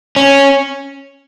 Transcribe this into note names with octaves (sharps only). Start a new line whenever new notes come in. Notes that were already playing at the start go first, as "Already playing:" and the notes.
C#4